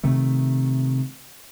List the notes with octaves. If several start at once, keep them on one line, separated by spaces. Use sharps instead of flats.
C3 D#3 A3